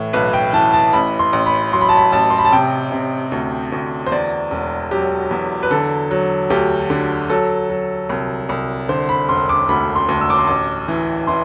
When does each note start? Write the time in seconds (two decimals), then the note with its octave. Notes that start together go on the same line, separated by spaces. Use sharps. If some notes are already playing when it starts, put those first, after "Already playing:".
Already playing: A2 E3
0.13 B1 B4
0.33 G5
0.53 E3 A5
0.73 A5
0.93 A1 B5
1.19 C6
1.33 A1
1.46 B5
1.72 F#3 C6
1.81 B5
1.89 A5
1.97 B5
2.12 A1 A5
2.30 C6
2.38 B5
2.45 A5
2.52 C3 G5
2.92 C3
3.32 D2
3.72 D2
4.06 C5
4.12 E2 D5
4.51 E1
4.91 F#3 G4
5.31 E2
5.63 B4
5.71 D3 A4
6.11 F#3
6.50 D2 G4
6.90 D3
7.30 F#3 A4
7.70 F#3
8.09 C2
8.49 C2
8.89 D3 C5
9.09 B5
9.29 E1 C6
9.49 D6
9.69 D2 B5
9.96 C6
10.09 D2
10.21 E6
10.30 D6
10.39 C6
10.47 A1 D6
10.88 E3
11.27 E3 C6